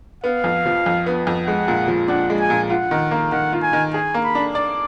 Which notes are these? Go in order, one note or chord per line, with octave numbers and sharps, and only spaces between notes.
B3 F5
F2
F3
F2
B3
F2
G#3 F#5
A#2
F3
D4 F#5
G#3
G#5
A#2
F4 F#5
D#3
A#3
D#3 F#5
F4
G#5
D#3
G#4 G#5
A#3
B5
D4
D5 D6